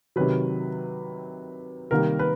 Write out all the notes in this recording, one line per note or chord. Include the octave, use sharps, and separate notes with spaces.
C3 D#3 F#3 B4
C3 D#3 G3 A#3 A#4
B4